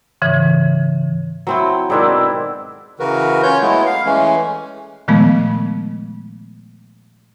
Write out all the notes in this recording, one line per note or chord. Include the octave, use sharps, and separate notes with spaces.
G#2 C#3 E3
F#3 C4 E4
G#2 B2 D#3 C4 D4 E4
C#3 E3 F#4 A#4 B4
C#4 F4 C#5 G6
F#3 G#3 A3 B3 E4
F5
E3 G#3 A3 C#4
A#2 D#3 F3 G#3 A3 B3